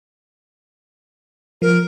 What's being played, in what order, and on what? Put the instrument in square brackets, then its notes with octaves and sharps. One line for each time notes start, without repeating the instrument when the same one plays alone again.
[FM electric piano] F3 [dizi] A#4